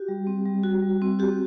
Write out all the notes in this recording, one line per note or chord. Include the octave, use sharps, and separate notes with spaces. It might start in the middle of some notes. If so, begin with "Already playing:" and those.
Already playing: F#4 G4
G3
C4
G3
F#4
G3
C4
F#4 G4